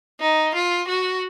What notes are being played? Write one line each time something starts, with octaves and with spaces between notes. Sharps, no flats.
D#4
F4
F#4